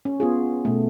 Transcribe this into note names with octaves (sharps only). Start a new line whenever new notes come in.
C#4
B3 F4 G#4
B2 A3